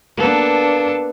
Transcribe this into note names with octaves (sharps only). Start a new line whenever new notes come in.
A#3 B3 D4 A4